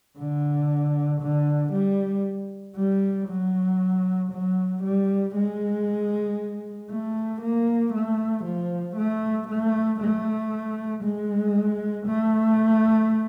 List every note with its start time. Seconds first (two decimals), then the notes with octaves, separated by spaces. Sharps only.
0.18 D3
1.22 D3
1.73 G3
2.76 G3
3.28 F#3
4.32 F#3
4.83 G3
5.35 G#3
6.90 A3
7.42 A#3
7.93 A3
8.45 F3
8.97 A3
9.48 A3
10.00 A3
11.04 G#3
12.07 A3